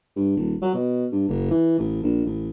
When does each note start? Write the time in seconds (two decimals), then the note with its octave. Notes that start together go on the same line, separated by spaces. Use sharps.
0.16 G2
0.37 D#1
0.62 F#3
0.74 B2
1.12 G2
1.29 F#1
1.51 E3
1.79 A1
2.03 A#1
2.25 A1